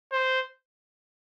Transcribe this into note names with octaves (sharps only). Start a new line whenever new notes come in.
C5